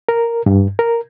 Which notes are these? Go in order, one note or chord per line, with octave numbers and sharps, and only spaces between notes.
A#4
G2
A#4